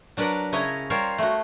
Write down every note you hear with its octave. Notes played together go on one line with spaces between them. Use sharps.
F#3 D4 A#4 B4 D5 F#5
C#3 E4 C#5 D#5 G#5 A#5
G3 F4 A#4 C5 C#5
A3 F#4